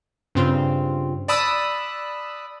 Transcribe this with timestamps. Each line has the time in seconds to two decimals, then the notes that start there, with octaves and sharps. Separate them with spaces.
0.35 G2 C#3 C4 F4
1.28 D5 A5 B5 D#6 E6 F#6